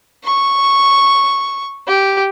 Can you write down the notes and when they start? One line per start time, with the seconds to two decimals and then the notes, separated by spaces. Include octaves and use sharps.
0.24 C#6
1.87 G4